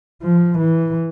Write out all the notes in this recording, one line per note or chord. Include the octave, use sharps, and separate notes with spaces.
F3
E3